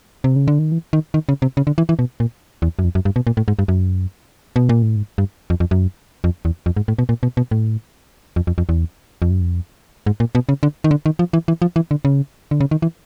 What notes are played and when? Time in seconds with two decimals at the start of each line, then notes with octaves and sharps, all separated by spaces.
0.24 C3
0.36 C#3
0.48 D3
0.59 D#3
0.72 E3
0.93 D#3
1.14 D#3
1.29 C#3
1.42 C3
1.57 C#3
1.67 D3
1.78 E3
1.89 E3
1.99 B2
2.20 A#2
2.62 E2
2.79 F#2
2.84 F2
2.95 F#2
3.05 G2
3.16 B2
3.27 A#2
3.37 A2
3.48 G#2
3.59 G2
3.68 F#2
4.56 B2
4.69 A#2
4.82 A2
4.96 G#2
5.18 G2
5.50 F2
5.60 F2
5.71 F#2
6.24 F2
6.45 E2
6.66 F2
6.77 G#2
6.88 A2
6.99 B2
7.09 A#2
7.23 B2
7.37 B2
7.51 A2
8.36 F2
8.47 F2
8.58 F2
8.69 E2
9.22 F2
9.31 F#2
9.41 F2
10.06 G#2
10.20 A#2
10.35 B2
10.49 C#3
10.63 D3
10.84 D#3
10.91 D3
11.06 D#3
11.19 F3
11.33 E3
11.48 E3
11.62 F3
11.76 E3
11.91 D3
12.05 C#3
12.51 D3
12.61 C#3
12.71 D#3
12.82 E3